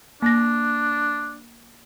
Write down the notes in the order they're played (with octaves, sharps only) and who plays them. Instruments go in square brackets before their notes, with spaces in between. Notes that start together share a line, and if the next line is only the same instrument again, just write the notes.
[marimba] A#3 A#6 [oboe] D4